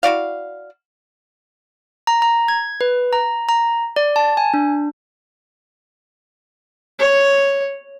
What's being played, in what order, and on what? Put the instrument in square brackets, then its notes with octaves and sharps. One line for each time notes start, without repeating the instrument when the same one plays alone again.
[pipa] E4 F#4 D5 F5
[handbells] A#5
A#5
G#6
B4
A#5
A#5
D5
A5
G#5
D4
[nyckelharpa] C#5